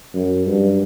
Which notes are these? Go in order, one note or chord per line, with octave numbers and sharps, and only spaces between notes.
F#2
G2